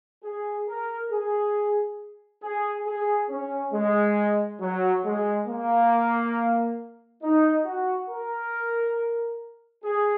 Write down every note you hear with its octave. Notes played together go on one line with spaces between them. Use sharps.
G#4
A#4
G#4
G#4
G#4
C#4
G#3
F#3
G#3
A#3
D#4
F#4
A#4
G#4